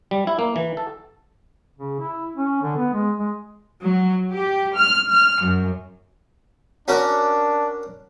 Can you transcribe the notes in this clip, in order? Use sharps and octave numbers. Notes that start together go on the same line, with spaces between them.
G3
E4
A#3
E3
A4
C#3
E4
C#4
D3
B3
G#3
G#3
F#3
G4
F6
F6
F#2
C#4 D4 F#4 A#4